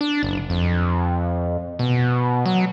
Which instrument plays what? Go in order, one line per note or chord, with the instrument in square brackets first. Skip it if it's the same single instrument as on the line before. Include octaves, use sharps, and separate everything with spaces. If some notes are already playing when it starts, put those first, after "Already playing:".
[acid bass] D4
F#1
F2
B2
F#3